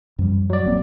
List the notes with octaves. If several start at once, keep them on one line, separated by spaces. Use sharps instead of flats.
F#2 F3 G3
F#3 D5
D#1 A#3 C4